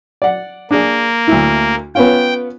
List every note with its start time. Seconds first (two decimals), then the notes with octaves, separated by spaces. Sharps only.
0.22 D5 F#5
0.71 A#3 D4 G#4
1.28 D2 E4
1.95 B3 C#4 F4 G5